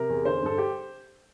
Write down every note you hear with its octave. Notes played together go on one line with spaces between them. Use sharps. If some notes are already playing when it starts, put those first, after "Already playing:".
Already playing: C3 A#4
E2
D3 C5
G2 A4
G4